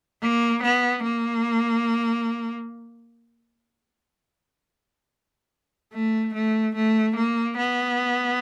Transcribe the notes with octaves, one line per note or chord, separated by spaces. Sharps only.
A#3
B3
A#3
A3
A3
A3
A#3
B3